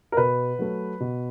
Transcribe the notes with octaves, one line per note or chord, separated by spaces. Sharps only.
A#4
B2 B4
F#3 A3
B2